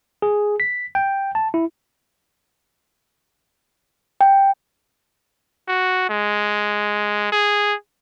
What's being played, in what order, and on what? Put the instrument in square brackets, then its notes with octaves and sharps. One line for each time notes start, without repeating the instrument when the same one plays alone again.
[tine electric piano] G#4
B6
G5
A5
E4
[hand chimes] G5
[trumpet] F#4
G#3
G#4